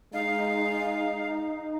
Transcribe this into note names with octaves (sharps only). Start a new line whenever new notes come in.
G#3 D#4 F5